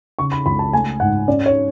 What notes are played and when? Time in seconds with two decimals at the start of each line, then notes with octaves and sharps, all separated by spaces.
0.19 C#3 C#6
0.32 B5
0.46 C#2 B5
0.59 A5
0.73 A3 G#5
1.00 G#2 F#5
1.28 C#4 D5
1.46 C#5